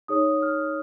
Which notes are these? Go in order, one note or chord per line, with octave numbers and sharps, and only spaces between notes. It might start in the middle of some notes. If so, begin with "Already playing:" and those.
D#4 G#4 C#5 D#6
F6